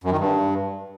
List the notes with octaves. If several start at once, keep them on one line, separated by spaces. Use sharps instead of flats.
F#2
D#3
G2